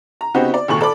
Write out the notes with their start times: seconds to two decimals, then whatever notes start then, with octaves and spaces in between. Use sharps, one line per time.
0.21 A#5
0.34 C#3 B3 C4 D#4 F#4 G4
0.54 D5
0.68 G#1 D#2 A#2 A4 C#6 F#7
0.81 A4 D5 B5 D6